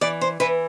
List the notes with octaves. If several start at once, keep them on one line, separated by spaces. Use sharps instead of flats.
E3 D5
C5
E3 B4